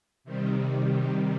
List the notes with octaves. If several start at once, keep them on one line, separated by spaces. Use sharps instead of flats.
C3 D#3 G3